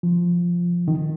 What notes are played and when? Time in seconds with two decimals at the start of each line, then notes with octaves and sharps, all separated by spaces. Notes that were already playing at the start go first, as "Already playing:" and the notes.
0.03 F3
0.88 D#3